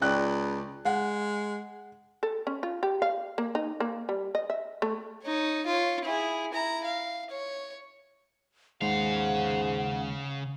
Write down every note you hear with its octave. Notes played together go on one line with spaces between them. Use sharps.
C#2 D5 G5 F#6
G#3 F#5
A4
C#4
F4
G4
F5
A#3
D#4
A#3
G3
D#5
E5
A3
D#4 C#5
F4 C#5
E4 G#4
E4 A#5
F5
C#5
D#2 G#2 C#3 G#3 F5 F#5 C6